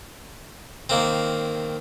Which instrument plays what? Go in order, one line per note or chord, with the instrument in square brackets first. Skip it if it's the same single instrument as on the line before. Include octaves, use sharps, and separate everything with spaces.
[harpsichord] D#3 A#3 C4